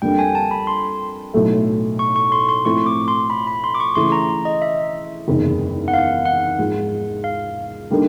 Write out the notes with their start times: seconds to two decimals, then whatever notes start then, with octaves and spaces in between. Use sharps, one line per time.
0.02 F2 D3 G3 A#3 D4 G5
0.19 G#5
0.35 A5
0.51 B5
0.67 C6
1.34 B1 A2 F#3 A3
1.99 C#6
2.16 C#6
2.32 C6
2.49 C6
2.65 A2 F3 A3 C4 E4 C#6
2.86 D6
3.08 C6
3.30 B5
3.47 B5
3.64 C6
3.75 D6
3.80 C#6
3.95 C#3 E3 A3 C6
4.12 A#5
4.45 D#5
4.62 E5
5.28 F#1 E2 C3 D#3 G#3
5.88 F#5
5.94 F5
6.25 F#5
6.59 G#2 F3 G#3
7.24 F5
7.90 D3 G3 A#3 D#4